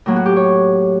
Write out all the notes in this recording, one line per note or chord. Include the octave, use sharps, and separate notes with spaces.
A2 F#3 A#3
F#4
G4
C#5